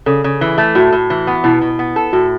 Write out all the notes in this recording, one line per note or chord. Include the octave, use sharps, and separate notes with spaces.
C#3 A4
C#3
E3
A3
A2 F#4
A2
E3
B3
B2 E4
B2
B3
A4
A2 F#4